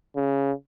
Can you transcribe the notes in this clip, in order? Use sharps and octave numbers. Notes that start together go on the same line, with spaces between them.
C#3